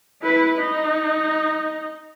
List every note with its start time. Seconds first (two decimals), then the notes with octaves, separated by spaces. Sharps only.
0.22 E4 B4
0.58 D#4